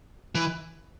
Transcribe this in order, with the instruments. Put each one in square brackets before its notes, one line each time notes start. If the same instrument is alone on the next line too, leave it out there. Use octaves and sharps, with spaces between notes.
[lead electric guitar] E3